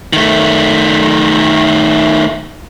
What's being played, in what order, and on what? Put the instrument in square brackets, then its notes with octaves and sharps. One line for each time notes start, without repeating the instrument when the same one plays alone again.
[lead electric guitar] D#3 A3